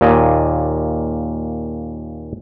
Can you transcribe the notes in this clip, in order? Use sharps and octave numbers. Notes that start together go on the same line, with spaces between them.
D#2 A#2 D5 D#5 G#5